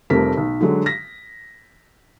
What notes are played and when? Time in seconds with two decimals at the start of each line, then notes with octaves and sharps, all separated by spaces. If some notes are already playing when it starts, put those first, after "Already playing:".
0.10 F1 F2 G3 A3 A#4 B6
0.37 B1
0.61 D3 F#3 G#3
0.86 A#6 B6